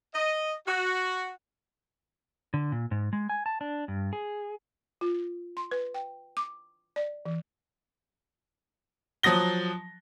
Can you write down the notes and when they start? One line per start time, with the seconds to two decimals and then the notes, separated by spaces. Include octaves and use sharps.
0.14 D#5
0.67 F#4
2.54 D3
2.72 A#2
2.91 G#2
3.13 G#3
3.29 G#5
3.46 A5
3.61 D4
3.88 G2
4.13 G#4
5.01 F4
5.57 C6
5.71 B4
5.94 G5
6.37 D6
6.96 D5
7.26 E3
9.23 F3 F#3 D#6 A#6 G7